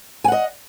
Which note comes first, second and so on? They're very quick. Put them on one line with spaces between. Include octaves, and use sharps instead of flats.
G#5 F#5 D#5